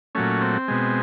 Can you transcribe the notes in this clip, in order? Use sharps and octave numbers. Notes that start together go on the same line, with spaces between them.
A#2 F#3 A3 C#4
C4
B2 G#3